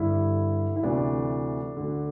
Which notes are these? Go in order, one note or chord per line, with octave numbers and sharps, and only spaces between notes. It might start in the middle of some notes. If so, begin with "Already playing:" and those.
Already playing: G2 D3 E4
E4
D2 C3 E3 D4
D2 D3